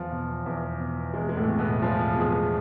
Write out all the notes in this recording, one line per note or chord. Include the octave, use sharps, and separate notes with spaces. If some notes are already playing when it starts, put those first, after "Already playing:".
Already playing: E2 F3
B2
E2
B2
E2 G#3
G#3
A2 A3
B2
B2 B3
E2 F3 F4
B2 G#3 G#4